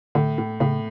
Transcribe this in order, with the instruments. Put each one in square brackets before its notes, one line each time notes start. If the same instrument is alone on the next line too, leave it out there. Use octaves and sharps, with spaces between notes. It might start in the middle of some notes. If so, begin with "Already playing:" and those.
[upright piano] A2 [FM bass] D3
[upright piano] A2
[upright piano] A2 [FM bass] C#3